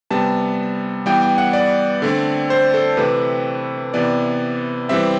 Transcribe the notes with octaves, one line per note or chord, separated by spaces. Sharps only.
C3 G3 B3 A5
E3 G3 B3 G5
G5
F#5
D5
D3 A3 C4
C5
A4
C3 E3 A3 C4 B4
C3 E3 B3 D5
E3 G3 C4 E5